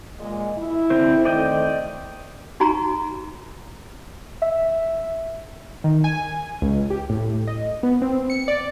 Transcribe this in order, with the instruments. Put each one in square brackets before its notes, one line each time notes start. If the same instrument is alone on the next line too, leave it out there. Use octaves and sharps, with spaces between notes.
[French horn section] A#2 G#3
E4
[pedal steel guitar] D3 C4 C5
[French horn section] D#3 A3 C4 [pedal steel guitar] D5 D#5 G5
[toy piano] D#4 F#4 G#5 A#5 C#6
[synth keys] E5
D#3
G#5
C#2
G4
A2
D#5
B3
C4
C#7
D5